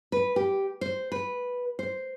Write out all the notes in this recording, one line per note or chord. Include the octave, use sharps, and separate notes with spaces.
B4
G4
C5
B4
C5